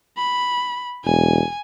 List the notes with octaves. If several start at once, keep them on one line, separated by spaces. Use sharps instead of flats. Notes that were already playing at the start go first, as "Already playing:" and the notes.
B5
E1 G#5